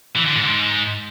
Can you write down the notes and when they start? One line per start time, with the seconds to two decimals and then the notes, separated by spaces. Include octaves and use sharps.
0.16 E3
0.26 D3
0.36 G#2